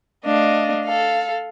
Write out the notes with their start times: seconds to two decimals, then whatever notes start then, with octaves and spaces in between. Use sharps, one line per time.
0.24 A3 D4 D#5 F5
0.85 A4 F5